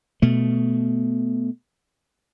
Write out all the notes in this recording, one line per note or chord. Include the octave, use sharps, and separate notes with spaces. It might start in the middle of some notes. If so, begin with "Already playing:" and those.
B2 A3